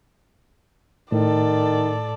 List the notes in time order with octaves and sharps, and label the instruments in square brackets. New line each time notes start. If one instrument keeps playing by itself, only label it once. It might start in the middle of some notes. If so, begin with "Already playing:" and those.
[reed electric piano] A2 [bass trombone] D#3 [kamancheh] A4 D5